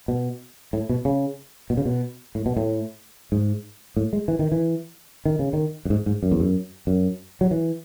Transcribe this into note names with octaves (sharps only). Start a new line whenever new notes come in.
B2
A2
B2
C#3
B2
C#3
B2
A2
B2
A2
G#2
A2
G#3
E3
D#3
E3
D#3
C#3
D#3
F#2
G#2
G#2
F#2
E2
F#2
F#2
F#3
E3